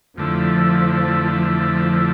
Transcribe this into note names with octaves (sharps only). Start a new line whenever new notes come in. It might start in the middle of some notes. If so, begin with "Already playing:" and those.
F2 D3 F3 A3 E4
F3